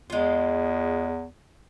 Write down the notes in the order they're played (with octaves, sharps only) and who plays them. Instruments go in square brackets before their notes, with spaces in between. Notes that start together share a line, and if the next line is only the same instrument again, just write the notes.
[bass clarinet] E2 [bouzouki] G#3 F4